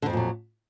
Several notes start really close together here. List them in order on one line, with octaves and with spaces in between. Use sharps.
D3 F2 F3 A#2 F#3